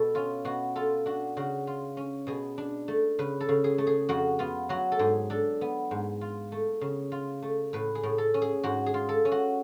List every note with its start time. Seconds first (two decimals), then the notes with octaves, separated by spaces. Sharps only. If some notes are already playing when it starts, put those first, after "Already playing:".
Already playing: B2 A4
0.15 C#4 F4
0.45 B2 F#4
0.75 F4 A4
1.06 D4 F#4
1.37 C#3 F#4
1.67 F4
1.97 C#4
2.27 B2 G#4
2.58 D4
2.88 A3
3.19 C#3 B4
3.40 A4
3.49 C#3
3.64 G#4
3.78 A3
3.87 G#4
4.09 F2 F#4
4.39 B3 F4
4.69 F#3 F#4
4.92 A4
4.99 G#2 G#4
5.30 D4 A4
5.61 B3
5.91 G#2
6.21 F4
6.52 A3
6.81 C#3
7.12 F4
7.42 A3
7.73 A2 B4
7.95 G#4
8.03 A2
8.18 A4
8.34 C#4
8.42 G#4
8.63 G#2 F#4
8.86 G#4
8.94 F4
9.09 A4
9.25 C#4
9.32 F#4